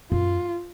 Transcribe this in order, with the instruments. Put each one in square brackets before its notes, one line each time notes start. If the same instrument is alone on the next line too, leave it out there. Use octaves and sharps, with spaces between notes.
[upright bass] F#2 [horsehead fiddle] F4